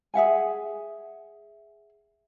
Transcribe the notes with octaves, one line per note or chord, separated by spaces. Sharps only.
G#4 E5 F#5 G#5